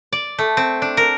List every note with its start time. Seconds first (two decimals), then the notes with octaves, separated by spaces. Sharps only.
0.12 D5
0.38 A3
0.57 C4
0.82 D4
0.97 A#4